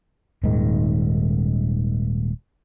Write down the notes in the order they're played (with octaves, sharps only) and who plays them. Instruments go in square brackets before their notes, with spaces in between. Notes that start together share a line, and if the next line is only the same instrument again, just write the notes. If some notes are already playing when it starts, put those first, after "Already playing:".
[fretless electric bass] D#1 G#2 D#3